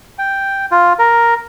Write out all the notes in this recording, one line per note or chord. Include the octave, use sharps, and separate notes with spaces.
G5
F4
A#4